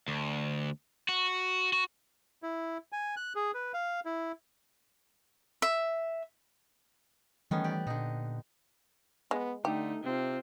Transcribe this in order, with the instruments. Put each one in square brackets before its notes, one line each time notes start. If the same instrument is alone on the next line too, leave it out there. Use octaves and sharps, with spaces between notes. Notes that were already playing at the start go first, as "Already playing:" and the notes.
[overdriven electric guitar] D2
F#4
F#4
[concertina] E4
G#5
F#6
G#4
B4
F5
E4
[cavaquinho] E5
[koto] D#3 B3 C#4 [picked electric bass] E3 G3 A3
[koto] G4 D5
[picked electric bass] A#2 [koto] D3 D#4
[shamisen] G#3 [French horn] B3
[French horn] D3 [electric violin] A3 D#4 [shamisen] G4
[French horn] C3 [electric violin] C4 F4